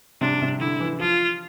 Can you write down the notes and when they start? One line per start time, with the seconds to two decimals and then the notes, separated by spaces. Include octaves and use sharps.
0.21 C3 D4
0.42 C3
0.60 D3 E4
0.80 E3
1.00 F3 F4